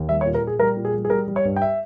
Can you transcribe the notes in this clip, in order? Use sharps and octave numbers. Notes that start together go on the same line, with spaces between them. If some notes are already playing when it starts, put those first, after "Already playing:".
Already playing: D#2
G3 E5
C#5
A#2
A#4
A#2
G#4
G3 A#4
A#2
G#4
G3
G#4
G3 A#4
G3
C#5
G2
G5
E5